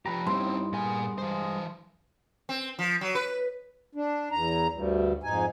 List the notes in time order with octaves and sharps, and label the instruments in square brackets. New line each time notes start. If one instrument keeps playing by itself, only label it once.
[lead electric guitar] F3 G4 [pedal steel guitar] B4 A#5
[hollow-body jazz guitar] G2 [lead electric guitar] C4 C#4 [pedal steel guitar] D#4 E4 [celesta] C6
[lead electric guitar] A#2 G#5 [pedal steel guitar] B3 G#4 A#4
[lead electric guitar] E3 C5 [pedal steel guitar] G#3
[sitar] C4
F3
F#3
B4
[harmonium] D4
E2 A#5
D2 G2
F2 G#2 D#4 G#5